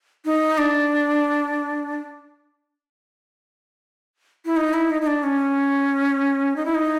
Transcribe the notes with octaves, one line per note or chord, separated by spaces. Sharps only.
D#4
D4
E4
D#4
E4
D#4
D#4
D4
C#4
D#4
E4
D#4